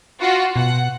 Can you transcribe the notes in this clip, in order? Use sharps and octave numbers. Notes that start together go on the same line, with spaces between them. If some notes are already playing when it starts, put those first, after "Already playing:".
F4 F#4
B2 F#5